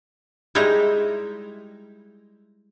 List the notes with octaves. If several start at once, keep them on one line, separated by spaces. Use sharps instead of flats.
G3 G#3 D#4 E4 A#5